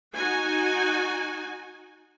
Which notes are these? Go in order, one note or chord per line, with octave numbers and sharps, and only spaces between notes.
D#4 F#4 G#5